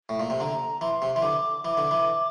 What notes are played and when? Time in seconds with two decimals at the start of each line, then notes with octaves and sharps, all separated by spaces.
0.09 A2
0.20 A#2
0.30 C3
0.40 D3 A#5
0.81 E3 C6
1.02 C3
1.16 E3
1.22 D3 D6
1.65 E3 D6
1.77 D3
1.91 E3